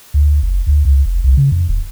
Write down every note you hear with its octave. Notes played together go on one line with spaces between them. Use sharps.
D2
F#1
D2
C#2
F1
C2
C#3
F2
D#1